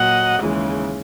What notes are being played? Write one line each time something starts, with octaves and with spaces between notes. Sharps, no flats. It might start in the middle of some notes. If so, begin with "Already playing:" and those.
Already playing: A#2 F#3 D#5 F#5
D#2 C#3 E3 G#3